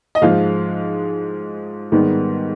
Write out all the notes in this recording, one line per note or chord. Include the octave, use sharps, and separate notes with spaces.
D#5
G#2 F3 G#3 F5
G#2 D#3 G3 B3